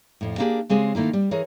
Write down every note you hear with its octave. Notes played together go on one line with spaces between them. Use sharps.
F2 A2
A#3 B3 D4 D#4 G4 G#4
C#3 G#3 C4 G4 G#4
D#3 A3 A#3 E4
G3
E3 G#4 A#4 C#5